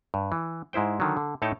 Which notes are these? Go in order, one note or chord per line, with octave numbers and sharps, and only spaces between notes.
G2
E3
G#2 G#3 E4 C5 G5
D3 D#3 F#3
D3
A2 A3 D#4 C#5 G5 A5